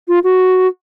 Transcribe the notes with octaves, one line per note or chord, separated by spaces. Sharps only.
F4
F#4